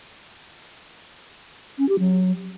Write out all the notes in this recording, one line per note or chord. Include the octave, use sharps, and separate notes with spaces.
C#4
G4
F#3